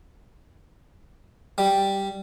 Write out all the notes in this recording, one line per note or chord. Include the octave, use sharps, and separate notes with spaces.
G3